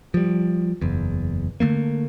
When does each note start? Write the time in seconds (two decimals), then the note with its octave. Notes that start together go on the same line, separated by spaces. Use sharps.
0.14 F3 G3
0.81 F#1 E2
1.60 D3 F#3 A3 A#3